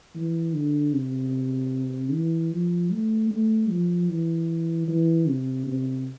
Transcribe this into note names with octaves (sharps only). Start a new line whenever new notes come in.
E3
D3
C3
E3
F3
A3
A3
F3
E3
E3
C3
C3